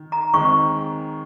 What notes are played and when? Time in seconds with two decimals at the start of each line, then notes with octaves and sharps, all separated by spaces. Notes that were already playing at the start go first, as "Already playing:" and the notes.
Already playing: D#3
0.12 A#5
0.33 D#2 D#3 G#3 C4 C#6